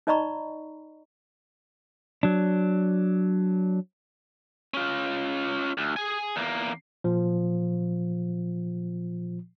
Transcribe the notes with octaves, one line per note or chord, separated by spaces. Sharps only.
D#4 D5 D#5 A#5 B5 C#6
F#3 D4
C#4 F4
D2
G#4 G#5
E2 A#3
A#2 F3